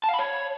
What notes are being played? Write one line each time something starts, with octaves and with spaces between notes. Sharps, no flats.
A5
F5
B5
C#5